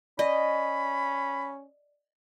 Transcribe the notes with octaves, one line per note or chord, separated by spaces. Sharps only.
C#4 D5 D#5 B5